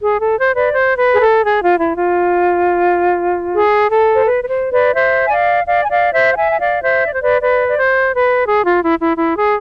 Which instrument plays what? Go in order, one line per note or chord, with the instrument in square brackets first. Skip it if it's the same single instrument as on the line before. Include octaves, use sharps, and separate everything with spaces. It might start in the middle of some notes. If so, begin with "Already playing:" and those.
[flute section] G#4
A4
C5
B4 D5
C5
B4
G#4
A4
G#4
F4
E4
F4
G#4
A4
C5
B4
B4
C5
B4 D5
C5 E5
G#5
D5 F5
D5 F5
G#5
D5 F5
C5 E5
F5
E5 G#5
G#5
D5 F5
C5 E5
D5
C5
B4 D5
B4 D5
D5
C5
B4
G#4
F4
E4
E4
E4
G#4